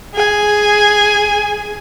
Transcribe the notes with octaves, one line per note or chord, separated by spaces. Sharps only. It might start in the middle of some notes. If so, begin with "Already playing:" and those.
G#4 G#5